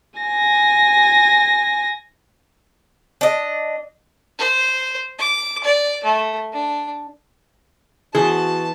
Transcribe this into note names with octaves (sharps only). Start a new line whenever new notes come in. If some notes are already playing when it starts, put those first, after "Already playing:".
G#5 A#6
D4 D#5
C5
D6
D5
A3
D4
E3 B3 F#4 G#4 C5 A5